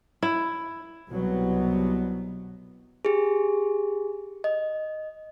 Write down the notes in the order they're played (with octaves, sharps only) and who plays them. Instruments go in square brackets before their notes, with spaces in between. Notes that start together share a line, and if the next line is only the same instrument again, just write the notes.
[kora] E4
[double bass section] C2 B2 F#3 B3
[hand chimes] G4 G#4
D#5